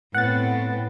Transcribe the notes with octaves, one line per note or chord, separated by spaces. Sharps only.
A2 B3 C4 F#5 A6